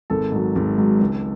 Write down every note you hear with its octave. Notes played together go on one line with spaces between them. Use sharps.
G#1 A4
G#2 F#3
G#1
G#2 F#3
C#2